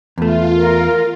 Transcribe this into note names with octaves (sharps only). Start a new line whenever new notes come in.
E2 A3 F4
A#4